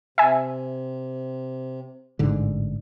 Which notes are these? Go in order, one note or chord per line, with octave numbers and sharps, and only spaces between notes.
C3 E5 G#5
A1 G#2 D3